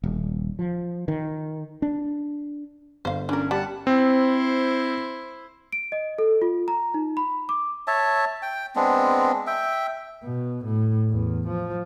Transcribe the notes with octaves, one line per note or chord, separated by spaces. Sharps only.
D#1
F3
D#3
D4
G1 C5 F5
E3 C#4 D4 A#4
G3 F#5 A5
C4 E4 C5
D7
D#5
A4
F4
A#5
D#4
B5
D6
C#5 E5 A5
G5
G#3 B3 C4 D4
E5 G5
B2
A2
E2
F3